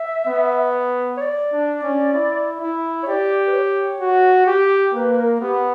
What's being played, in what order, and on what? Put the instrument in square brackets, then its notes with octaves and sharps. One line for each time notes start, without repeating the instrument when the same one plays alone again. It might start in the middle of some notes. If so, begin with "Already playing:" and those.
Already playing: [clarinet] E5
[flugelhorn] B3
[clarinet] C#5
D5
[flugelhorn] D4
C#4
E4
E4
[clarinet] C#5
[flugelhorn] G4 [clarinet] D5
[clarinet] B4
C#5
[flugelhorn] F#4
G4
[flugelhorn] A#3 [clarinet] B4
[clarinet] B4
A#4
[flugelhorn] B3 [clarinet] G4